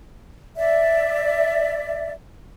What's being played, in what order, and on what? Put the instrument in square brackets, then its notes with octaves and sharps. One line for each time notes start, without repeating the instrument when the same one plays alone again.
[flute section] D5 E5